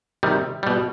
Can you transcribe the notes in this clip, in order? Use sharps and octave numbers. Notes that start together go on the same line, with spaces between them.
C3 D#3 G3
B2 G3